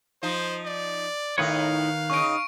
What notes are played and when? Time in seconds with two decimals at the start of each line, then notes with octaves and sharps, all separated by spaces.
0.23 F3 D#4 C5
0.65 D5
1.38 A2 D#3 D#4 B4 C#5 F5
2.10 C#3 D#4 C#6 D7